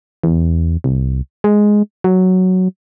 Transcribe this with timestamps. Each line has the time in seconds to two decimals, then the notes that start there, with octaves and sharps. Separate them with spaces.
0.24 E2
0.84 C2
1.44 G#3
2.04 F#3